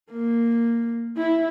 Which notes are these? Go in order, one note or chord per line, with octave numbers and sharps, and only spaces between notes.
A#3
E4